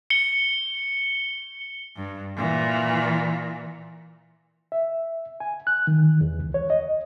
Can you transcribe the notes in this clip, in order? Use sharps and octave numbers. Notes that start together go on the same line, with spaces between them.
C#7 G7
G2
A#2 E3
E5
G#5
F#6
D#3
E2
C#2
C#5
D#5